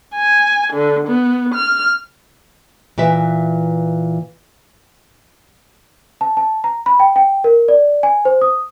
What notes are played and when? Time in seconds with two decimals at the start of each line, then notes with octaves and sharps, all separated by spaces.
0.15 G#5
0.72 D3
1.07 B3
1.54 F6
2.98 A#2 E3 B4 E5
6.21 A5
6.37 A5
6.64 A#5
6.86 B5
7.00 G5
7.16 G5
7.44 A#4
7.68 D5
8.03 G#5
8.25 C5
8.41 D#6